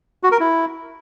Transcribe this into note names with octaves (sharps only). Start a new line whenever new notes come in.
F#4
A#4
E4